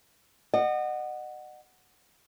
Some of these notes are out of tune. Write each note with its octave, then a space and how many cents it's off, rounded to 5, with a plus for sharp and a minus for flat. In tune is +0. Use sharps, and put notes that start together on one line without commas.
D#5 -35 F#5 +0